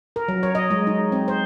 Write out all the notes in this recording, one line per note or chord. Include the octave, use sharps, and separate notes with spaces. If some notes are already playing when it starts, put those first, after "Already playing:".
A#4
F#3
C#5
D#5
G#3
D#4
C4
C5